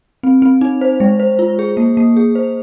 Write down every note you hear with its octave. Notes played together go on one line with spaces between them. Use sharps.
C4
C4
D#4
C5
G#3
C5
F4
G#4
A#3
A#3
G#4
C5